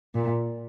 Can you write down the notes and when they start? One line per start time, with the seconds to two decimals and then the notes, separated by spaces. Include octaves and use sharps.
0.15 A#2